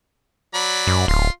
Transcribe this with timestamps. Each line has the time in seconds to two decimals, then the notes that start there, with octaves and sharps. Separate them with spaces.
0.54 F#3 D5 B5
0.87 F#2
1.08 D1 F4 C6